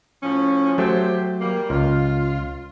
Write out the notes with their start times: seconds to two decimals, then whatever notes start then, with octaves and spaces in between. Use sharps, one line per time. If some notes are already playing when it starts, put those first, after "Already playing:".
0.23 A2 F3 C#4
0.78 F#3 A3 G4 C5
1.40 G3 A#3
1.70 C#2 F4